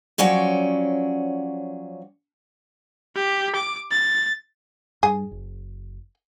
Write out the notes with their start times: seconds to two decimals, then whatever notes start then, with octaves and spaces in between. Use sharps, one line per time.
0.18 F3 F#3 C#4 D5 G5
3.16 G4
3.55 D6
3.91 A6
5.03 G2 G#4
5.31 F#1